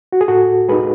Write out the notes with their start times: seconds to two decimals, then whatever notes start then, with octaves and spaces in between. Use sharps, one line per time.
0.12 F#4
0.21 G#4
0.28 A2 F#4 A4
0.69 G#3 D#4 G#4 B4